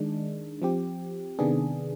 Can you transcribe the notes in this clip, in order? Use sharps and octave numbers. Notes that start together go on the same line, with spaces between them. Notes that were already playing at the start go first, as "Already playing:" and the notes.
Already playing: D#3 G#3 D4
F3 C4 G4
C3 D#3 B3 D4 G#4